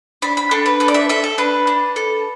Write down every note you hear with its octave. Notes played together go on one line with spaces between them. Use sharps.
D4 B5
B5
D4 A4
B4
A4 B4
D5
E5
A4 E5
A4
D4 B4
D4
A4